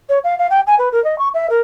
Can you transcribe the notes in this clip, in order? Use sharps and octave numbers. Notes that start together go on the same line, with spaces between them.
C#5
F5
F5
G5
G#5
B4
A#4
D#5
C#6
E5
A#4